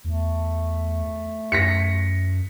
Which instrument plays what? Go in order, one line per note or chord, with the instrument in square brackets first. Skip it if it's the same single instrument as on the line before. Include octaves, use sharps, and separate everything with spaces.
[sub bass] E2 [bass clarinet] A3
[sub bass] F#2 [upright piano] A#6 B6 C#7